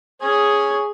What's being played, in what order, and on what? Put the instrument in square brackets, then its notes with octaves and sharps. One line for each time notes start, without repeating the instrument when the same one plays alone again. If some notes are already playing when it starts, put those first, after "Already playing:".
[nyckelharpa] G#4 [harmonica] C#5 G#5